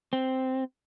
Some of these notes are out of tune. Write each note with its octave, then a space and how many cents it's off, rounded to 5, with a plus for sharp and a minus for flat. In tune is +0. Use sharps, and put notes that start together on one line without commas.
C4 -5